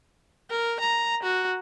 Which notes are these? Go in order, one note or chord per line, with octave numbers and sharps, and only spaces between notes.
A#4
A#5
F#4